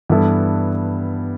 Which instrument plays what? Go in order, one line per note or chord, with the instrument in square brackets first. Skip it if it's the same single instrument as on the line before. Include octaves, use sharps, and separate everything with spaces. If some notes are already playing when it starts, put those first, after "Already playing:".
[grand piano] G2 E3 B3 E4 A4